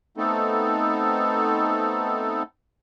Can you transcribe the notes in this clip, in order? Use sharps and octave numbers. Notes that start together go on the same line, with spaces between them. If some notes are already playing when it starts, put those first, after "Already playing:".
A3 B3 C4 D#4 A4